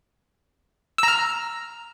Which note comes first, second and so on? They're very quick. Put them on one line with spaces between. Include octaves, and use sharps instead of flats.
E6 A#5 F6